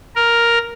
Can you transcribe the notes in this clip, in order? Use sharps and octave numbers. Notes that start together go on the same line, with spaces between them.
A#4